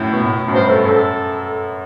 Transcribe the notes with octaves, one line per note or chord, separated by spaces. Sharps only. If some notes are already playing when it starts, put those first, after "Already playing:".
Already playing: F#2 A2
B2
A2
F#2
G2 C5
A4
F#2 A4